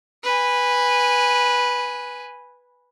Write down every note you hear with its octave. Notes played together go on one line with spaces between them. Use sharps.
B4 G#5